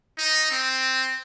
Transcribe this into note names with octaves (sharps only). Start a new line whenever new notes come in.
D#4
C4